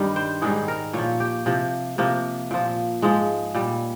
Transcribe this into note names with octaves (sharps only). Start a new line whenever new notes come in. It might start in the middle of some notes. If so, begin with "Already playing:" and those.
Already playing: G2 D#3 G3
C5
G#2 D#3 G3 G#4
A#4
A#2 F3 C#5
G4
C3 F3
C3 F3 A#3
A#2 F3
G#2 F3 G#3
A#2 G3